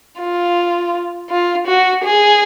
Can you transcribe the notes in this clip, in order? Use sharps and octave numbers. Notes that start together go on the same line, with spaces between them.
F4
F4
F#4
G#4